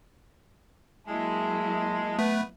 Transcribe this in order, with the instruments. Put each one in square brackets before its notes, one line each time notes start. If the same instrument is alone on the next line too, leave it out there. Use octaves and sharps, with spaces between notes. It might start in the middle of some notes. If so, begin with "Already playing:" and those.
[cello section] F#3 A#3 E4 [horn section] G#3 [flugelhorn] A5
[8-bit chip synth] A3 [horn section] B3 B4